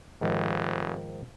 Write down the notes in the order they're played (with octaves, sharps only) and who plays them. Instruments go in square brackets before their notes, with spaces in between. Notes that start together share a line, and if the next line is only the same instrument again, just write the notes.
[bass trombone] F1 [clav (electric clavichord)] G#2 D#3 F3